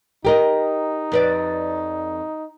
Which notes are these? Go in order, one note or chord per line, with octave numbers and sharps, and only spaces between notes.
D#4 G4 A#4 D#5
F2 B4 D5